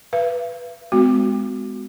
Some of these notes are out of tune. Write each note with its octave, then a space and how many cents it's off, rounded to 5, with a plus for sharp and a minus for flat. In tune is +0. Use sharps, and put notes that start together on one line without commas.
B4 +0 F5 -45
G#3 +0 B3 +45 F#4 +0